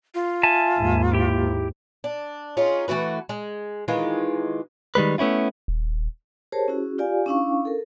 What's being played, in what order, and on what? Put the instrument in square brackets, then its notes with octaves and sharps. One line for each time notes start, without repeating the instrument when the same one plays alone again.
[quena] F4
[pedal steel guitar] E5 G#5 A5
[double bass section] D#2 G#2
[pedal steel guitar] E4 G4
[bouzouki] D4
C#4 D#4 F4 G#4
E3 A3 F#4 B4
G#3
D#3 E3 G#3 F4
[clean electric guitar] D#3 G3 G#3 B4
A3 B3 C#4 E4 F4
[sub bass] D#1
[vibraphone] G4 G#4 A#4 C5 C#5 A5
C#4 E4 F#4 G#4
F4 G4 D5 F5 G#5
C#4 D4 E4 F5 C#6
A4 A#4